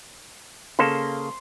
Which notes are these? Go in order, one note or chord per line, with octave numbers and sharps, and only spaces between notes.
C#3 A#3 A4 C6